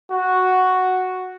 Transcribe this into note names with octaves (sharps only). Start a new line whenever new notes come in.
F#4